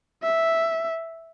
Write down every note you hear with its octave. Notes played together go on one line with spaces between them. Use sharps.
E5